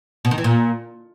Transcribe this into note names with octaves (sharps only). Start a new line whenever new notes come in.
B2
D#3
E3
A#2